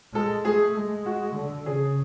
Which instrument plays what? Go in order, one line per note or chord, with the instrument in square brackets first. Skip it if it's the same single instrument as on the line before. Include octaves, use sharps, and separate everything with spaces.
[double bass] G#3 [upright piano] A4
[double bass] A3 [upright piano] G#4
[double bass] G#3
[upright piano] F#4
[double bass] D3
[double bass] C#3 [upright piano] G#4